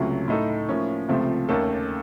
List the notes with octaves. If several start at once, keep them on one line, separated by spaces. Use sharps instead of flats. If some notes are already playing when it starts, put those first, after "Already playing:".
Already playing: C#2 C3 F#3 A3 C#4
A2 A3 D#4 A4
A2 F3 A#3 C#4
C#2 C3 F3 A3 C4
D#2 D#3 A3 C#4 A4